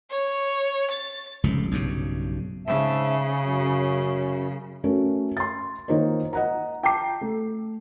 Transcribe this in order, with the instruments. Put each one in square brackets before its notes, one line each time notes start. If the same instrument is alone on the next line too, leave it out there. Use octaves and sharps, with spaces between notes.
[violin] C#5
A6
[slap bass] F1 C#2 G#2
B1 G2 C#3
[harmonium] G#2 E5 A5 [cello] C#3
[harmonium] F#2
[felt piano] A3 C#4 F#4 A#4
C6 A6
D#3 A#3 D#4 F4 C5 C#5
D#5 F#5 A#5
[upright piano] G5 A5 A#5 D6 C7
A3